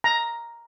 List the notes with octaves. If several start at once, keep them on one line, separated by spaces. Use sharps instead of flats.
A#5